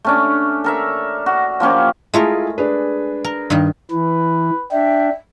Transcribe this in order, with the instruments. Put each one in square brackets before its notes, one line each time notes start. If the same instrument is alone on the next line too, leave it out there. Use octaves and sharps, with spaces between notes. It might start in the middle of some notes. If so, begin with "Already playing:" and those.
[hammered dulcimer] A3 C#4 D4
A4 A#4 E5
F#4
F3 A#3 C#4 G4
[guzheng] G#3 A3 A#4 [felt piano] E4 F4 G#4
[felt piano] D4 G#4 B4
[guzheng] A#4
G2 D#3
[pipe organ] E3 [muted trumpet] B4
[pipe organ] D4 [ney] E5 [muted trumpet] G5